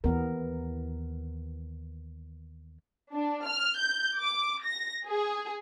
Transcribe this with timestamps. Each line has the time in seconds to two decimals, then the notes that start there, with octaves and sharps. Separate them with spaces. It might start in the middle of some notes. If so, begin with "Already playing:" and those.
0.04 D#2 E3 B3 A#4
3.12 D4
3.46 F6
3.77 G6
4.18 D6
4.64 A#6
5.06 G#4